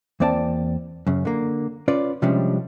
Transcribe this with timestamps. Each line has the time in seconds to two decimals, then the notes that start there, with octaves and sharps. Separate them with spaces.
0.20 E2 A#3 C4 D5 E5 A5
1.07 F#2 C#3
1.25 D3 A#3
1.88 C#4 F4 B4 D5
2.22 C3 F3 G3 G#3 C#4 D4